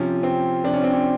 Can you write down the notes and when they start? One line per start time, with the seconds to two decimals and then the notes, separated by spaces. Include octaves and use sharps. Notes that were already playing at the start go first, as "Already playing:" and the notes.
Already playing: C3 F3 C#4
0.23 C4
0.64 C3 F3 D4
0.74 C#4
0.83 C4
0.93 C#4